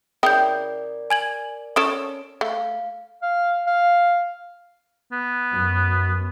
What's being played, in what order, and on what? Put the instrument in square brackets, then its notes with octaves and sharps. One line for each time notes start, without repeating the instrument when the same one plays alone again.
[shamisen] C#3 E4 G5 [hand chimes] A#4 D5 [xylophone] D#6 G6
[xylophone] G#5 G#6 F#7
[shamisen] C#4 A4 C#5 [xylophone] D#6 D7 E7
[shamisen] A3 [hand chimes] F5
[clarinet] F5
F5
[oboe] B3
[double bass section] F#2